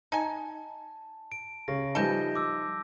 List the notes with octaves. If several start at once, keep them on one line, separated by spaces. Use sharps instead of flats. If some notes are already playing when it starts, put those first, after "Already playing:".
D#4 G#5 A5
D7
C#3 A#6
E3 F3 G3 D#4 A4 A5 G6 A#6
D6 E6